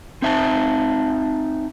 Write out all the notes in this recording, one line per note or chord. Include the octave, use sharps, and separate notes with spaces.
C4 D#4 E5 G#5 A5